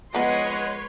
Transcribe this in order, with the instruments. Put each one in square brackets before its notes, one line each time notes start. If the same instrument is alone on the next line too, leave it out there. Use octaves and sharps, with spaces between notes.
[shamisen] F3 B3 [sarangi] G#3 [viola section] B4 C#5 C6 [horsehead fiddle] D#5 F#5